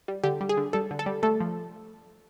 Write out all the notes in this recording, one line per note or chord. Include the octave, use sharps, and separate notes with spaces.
G3
D3 G4
G3
G#4
D3
G3 A4
D3
A4
G3
A3 A4
F3